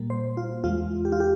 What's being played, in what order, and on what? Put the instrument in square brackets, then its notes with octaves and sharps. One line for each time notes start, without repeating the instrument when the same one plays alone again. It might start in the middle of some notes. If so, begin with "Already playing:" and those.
Already playing: [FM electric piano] A#2 G3 A#3
C5
F4
E2 E3 G#3 F4
G4
F4
G4